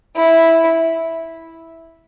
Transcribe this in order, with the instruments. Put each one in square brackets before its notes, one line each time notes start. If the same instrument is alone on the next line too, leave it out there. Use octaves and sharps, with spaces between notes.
[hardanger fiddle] E4